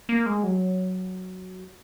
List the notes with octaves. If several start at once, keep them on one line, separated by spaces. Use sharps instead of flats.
A#3
G#3
F#3